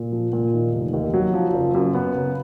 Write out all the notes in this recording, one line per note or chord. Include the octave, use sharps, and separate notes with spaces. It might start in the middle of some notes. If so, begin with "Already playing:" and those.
Already playing: A#2
F3
A#2
D#3
F1
D#2
F#3
F3
F#1
F#2
B3
C#3